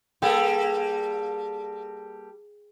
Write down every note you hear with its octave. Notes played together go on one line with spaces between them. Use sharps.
G3 A#3 G#4 A4 G5